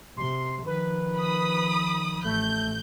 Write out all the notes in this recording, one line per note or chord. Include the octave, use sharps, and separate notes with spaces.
C3 C6
D#3 F3 B4
B5 D#6
A1 A3 G6